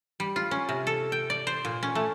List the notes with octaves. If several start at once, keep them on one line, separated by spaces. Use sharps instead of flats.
G3
F4
C#4
C3
A4
G5
D5
C5
A#2
C#4
A3